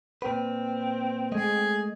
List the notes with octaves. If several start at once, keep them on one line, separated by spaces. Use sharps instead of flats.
A#2 C4 B4
G#3 A3 G#4 D#5